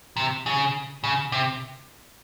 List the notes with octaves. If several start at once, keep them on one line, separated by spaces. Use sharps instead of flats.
C3
C#3
C#3
C3